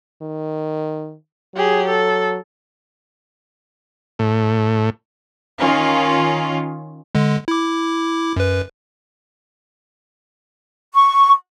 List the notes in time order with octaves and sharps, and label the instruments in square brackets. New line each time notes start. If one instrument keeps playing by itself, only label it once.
[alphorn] D#3
[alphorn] F#3 [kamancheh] G4 G#4
[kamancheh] A4
[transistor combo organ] A2
[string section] D#3 C#4 F4
[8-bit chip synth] D3 G#3
E4 D6
F#2 B4
[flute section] C#6